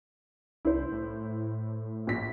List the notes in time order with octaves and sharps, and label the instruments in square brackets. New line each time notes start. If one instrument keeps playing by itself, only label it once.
[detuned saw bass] C2 [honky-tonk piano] E4 C5
[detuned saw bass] A2
[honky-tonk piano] A#1 B6